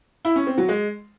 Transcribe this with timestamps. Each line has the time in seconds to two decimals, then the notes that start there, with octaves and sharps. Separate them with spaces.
0.25 E4
0.36 C#4
0.47 C4
0.58 F#3
0.69 G#3